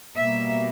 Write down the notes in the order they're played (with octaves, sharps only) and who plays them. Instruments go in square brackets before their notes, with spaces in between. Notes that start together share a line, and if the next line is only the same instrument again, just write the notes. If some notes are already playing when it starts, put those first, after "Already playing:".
[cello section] B2 G3 A#3 E5